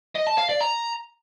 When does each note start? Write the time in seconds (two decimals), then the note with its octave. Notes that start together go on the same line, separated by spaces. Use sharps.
0.15 D#5
0.27 A5
0.38 F5
0.49 D5
0.61 A#5